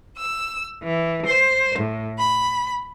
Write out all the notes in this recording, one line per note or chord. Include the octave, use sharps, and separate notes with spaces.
E6
E3
C5
A2
B5